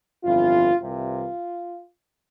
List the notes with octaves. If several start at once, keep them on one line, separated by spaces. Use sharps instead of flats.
G1 F2 E3 F4
C2 C3 E3 F4